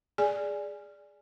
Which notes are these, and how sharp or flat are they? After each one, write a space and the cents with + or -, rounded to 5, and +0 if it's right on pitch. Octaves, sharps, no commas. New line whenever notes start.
G#4 +0 D5 +0 G#5 +0